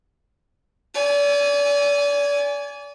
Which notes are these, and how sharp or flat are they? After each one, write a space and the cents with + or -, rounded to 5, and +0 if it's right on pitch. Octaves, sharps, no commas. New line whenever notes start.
D5 -35 G#5 +0